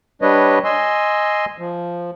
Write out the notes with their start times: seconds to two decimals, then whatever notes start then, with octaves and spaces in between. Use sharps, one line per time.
0.22 G3 D4 B4 C#5 D#5
0.64 D#5 G#5 C6 E6
1.58 F3